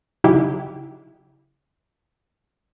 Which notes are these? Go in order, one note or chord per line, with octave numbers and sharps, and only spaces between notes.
C#3 F#3 D#4 E4 G4 G#4